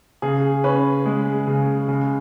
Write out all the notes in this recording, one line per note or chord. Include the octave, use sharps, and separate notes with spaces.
C#3 G#4
C#4 B4
G#3
C#3
C#3